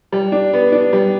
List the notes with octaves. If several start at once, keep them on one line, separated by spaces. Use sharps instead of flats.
G3
D4
B3
D4
G3